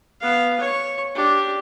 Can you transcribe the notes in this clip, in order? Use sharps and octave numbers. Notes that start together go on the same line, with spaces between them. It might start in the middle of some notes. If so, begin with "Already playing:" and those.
B3 F5
C#5 C#6
D4 G4